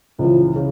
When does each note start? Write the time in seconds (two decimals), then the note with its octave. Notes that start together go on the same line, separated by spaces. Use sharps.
0.19 C#2 C#3 E3 F3
0.56 C#3